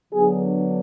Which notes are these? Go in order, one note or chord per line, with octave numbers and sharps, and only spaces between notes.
D3 F#3 B3 D4 G#4